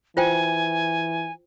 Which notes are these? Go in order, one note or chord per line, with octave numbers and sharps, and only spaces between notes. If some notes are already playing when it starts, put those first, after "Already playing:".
E3 F4 C5 G5 G#5